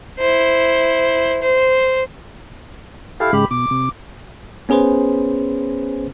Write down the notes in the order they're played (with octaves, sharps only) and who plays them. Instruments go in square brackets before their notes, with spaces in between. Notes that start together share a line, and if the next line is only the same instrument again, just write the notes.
[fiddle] E4 C5
C5
[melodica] E4 F5 [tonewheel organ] G4 A4
[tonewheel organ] G#2 C#3 G#3 [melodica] G4 B5
[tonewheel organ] B2 [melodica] D6
[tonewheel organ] C3
[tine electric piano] B3 C#4 G#4 B4 C5